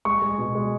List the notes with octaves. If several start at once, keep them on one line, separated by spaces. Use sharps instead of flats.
G#3 C#6
G#3
B2
G#3